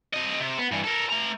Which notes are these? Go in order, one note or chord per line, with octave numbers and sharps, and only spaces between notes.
C4 D#5
C3
B3
G2 E3
A4 A#4
A3 A#5